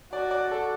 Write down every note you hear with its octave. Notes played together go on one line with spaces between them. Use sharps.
F#4 D5
D5
A4